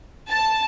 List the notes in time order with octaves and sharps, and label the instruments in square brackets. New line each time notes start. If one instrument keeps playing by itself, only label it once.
[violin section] A5